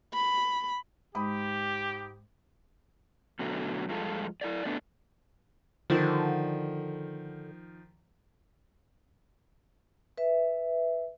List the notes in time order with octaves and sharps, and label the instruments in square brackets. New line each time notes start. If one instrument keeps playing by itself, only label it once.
[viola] B5
[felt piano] G#2 B5 D#6 [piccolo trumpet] G4
[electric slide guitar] B2 D3 F#3 A3
G2 F3 G#3 F4 A4
E4 A4 D5
A3 B3 D4
[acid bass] D3 [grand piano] D#3 F3
[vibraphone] B4 E5